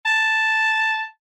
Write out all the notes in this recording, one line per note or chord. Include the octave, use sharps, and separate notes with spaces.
A5